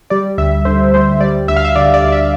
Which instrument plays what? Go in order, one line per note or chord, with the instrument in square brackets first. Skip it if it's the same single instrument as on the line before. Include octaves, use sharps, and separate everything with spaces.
[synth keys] G3 D5
D2 E5
D3 C5
D2 C5
G3 D5
D2 E5
F5
E5
D3 D5
D5
D2
E5